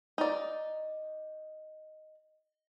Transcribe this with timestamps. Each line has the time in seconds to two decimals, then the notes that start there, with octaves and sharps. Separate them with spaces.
0.18 D#4 D5